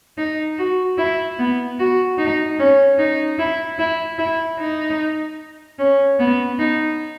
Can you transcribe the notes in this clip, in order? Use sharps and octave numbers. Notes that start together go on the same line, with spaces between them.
D#4
F#4
E4
B3
F#4
D#4
C#4
D#4
E4
E4
E4
D#4
C#4
B3
D#4